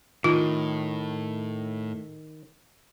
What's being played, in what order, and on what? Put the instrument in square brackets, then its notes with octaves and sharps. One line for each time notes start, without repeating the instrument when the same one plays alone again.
[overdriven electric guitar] A2 [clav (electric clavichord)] D#3 [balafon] F4